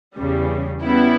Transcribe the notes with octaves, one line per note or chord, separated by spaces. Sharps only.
E2 C#3 G3
C#3 G3 B3 E4